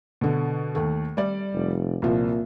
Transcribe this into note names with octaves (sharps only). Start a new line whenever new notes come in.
B2 D3
D#2 A3
G3 D5
F1
C2 A#2 F3